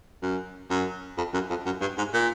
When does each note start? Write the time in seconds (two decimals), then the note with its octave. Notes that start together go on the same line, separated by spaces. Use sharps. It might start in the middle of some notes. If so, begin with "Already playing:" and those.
0.22 F#2
0.70 F#2
1.17 F2
1.33 F#2
1.49 F2
1.65 F#2
1.81 G2
1.98 G#2
2.13 A#2